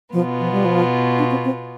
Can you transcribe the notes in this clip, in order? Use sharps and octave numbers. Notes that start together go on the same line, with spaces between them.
B2 F3 B3 F4
F3
G3
F3
D4
C4
C4